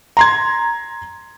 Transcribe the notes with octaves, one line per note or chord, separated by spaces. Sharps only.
A#5 C6 G#6